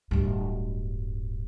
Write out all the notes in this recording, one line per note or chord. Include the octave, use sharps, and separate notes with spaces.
D1 G2